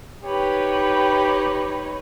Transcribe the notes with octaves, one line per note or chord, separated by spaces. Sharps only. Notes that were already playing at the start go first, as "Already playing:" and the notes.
D#4 G4 B4 C#5